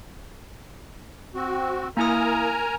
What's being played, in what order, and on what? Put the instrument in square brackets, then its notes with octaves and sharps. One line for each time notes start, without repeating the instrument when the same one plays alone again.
[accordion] C4 F#4
[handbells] A#3 E4 D#6 [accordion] A#4 G#5 A#5